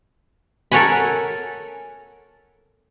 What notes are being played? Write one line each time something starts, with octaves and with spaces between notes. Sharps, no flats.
A4 A#4 C#5 F#5 G#5 B5